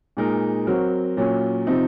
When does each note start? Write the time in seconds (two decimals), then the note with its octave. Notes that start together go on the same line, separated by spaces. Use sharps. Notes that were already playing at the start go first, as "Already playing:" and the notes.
0.17 A#2 G#3 D#4 A#4
0.67 F#3 C4 F#4 A#4
1.17 A#2 F#3 C#4
1.67 C3 F3 C4 D#4